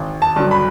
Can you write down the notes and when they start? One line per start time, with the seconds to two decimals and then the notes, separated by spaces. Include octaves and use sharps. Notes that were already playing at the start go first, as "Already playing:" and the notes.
Already playing: G#1
0.22 A5
0.36 G2 D3 F#3
0.51 B5